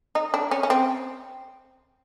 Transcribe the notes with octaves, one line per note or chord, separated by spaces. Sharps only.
D#4
D4
C#4
C#4
C4